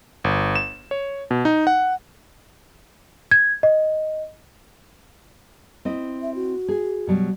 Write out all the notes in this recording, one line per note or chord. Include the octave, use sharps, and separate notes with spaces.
G1
E7
C#5
B2
D#4
F#5
G#6
D#5
C4 E4 D#5
E5
F#4
G#4
B2 F#3 G3